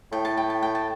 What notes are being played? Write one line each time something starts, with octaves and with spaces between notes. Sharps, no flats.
A2 G5
A5
G5
A5
G5
A5